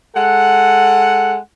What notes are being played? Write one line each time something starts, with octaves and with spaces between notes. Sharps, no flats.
G#3 A4 F#5